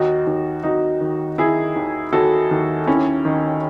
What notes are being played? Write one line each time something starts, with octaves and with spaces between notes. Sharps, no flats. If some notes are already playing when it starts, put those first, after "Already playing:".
Already playing: D#2 D#4 F#4
D#2
D#2 D#4 F#4
D#3
D#3 E4 G#4
D#2
D#2 F#4 A4
D#2
D#2 C#4 E4
D#3